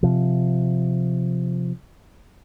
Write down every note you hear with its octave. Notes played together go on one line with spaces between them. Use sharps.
C3 F3